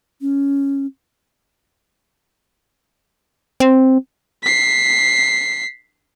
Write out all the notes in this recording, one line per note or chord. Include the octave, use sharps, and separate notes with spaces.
C#4
C4
B6 C7